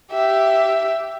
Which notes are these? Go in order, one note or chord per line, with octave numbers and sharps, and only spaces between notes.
G4 E5